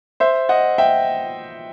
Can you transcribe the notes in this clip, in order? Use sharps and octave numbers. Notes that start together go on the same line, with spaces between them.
C5 E5
D#5 F#5
E5 G5